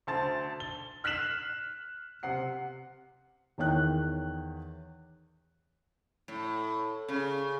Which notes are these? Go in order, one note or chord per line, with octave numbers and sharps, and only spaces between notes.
D2 C5 A5 A6
G7
F6 F#6 B6 C7 E7 F#7
C3 F#5 C7
E2 D#3 C#5 G5 F#6
A2
C#3